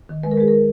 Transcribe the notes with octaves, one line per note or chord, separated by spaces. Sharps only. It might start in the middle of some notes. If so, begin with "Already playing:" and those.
D#3
G#3 B4
A#4
G#3 G#4
A#4